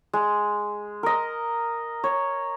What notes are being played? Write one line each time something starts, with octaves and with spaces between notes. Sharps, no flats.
G#3
A#4 D#5
C#5